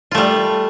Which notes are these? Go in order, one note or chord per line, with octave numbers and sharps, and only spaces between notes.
G3 A3 F4